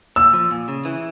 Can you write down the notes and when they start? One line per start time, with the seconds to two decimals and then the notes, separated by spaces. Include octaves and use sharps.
0.16 A#2 E6
0.33 F3
0.51 A#2
0.68 C#3
0.85 E3